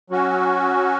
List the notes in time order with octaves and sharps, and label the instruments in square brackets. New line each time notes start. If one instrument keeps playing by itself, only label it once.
[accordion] F#3 C#4 F#4